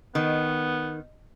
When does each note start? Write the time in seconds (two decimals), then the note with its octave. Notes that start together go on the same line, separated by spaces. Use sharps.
0.15 D#3 B3